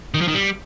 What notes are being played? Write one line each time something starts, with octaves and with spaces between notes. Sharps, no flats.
D#3
F3
D#3
G3